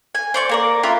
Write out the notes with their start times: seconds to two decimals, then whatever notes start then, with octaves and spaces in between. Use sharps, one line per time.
0.15 G#5
0.34 C5 D5 C#6
0.49 A#3 A#4 D5
0.83 F4 A#4 B4 E5